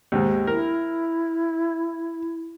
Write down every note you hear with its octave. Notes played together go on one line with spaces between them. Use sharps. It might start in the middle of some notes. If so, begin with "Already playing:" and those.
D#2 G#2
E4 A#4